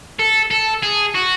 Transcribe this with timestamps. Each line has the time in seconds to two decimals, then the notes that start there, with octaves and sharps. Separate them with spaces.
0.19 A4
0.51 A4
0.83 G#4
1.14 F#4